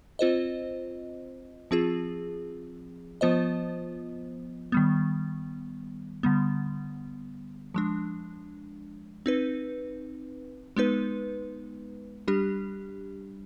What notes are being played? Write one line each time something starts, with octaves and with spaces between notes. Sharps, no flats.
C4 F4 C5 D#5
F3 C4 F4 G#4
F3 B3 F4 C5 D#5
D#3 G3 B3
D3 G3 B3
F3 G#3 D4
C4 D#4 B4
G#3 B3 D#4 B4
G3 D4 G4